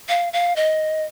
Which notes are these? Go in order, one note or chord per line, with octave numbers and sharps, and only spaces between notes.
F5
F5
D#5